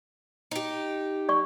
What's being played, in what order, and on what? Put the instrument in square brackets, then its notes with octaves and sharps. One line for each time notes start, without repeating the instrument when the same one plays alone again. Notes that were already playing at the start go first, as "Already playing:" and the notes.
[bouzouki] D#4 G4
[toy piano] D5 C#6